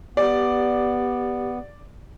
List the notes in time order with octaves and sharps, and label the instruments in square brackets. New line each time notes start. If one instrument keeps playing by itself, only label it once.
[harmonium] B3 [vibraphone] G4 [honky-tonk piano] D5